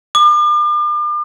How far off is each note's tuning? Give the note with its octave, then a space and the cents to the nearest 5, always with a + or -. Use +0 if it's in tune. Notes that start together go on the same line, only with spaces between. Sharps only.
D6 +40